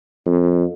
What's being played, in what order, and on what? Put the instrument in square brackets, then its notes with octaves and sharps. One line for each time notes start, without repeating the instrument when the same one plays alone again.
[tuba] F2